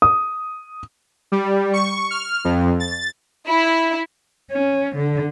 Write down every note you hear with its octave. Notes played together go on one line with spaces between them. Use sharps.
D#6
G3
C#6
F6
F2
A6
E4
C#4
D3